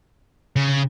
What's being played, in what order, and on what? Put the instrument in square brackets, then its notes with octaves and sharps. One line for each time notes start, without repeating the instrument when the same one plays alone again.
[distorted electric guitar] C#3